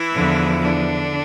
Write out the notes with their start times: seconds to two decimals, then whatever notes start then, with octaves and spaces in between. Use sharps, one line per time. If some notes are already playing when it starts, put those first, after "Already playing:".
Already playing: E3 E4
0.12 E2 D3 F3
0.62 D3 D4